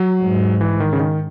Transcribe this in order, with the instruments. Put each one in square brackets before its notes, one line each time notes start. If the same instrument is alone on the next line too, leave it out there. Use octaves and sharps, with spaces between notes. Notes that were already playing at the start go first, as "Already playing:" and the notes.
Already playing: [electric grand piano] F#3
[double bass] G#2
[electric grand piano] E3
D#3
C#3
D#3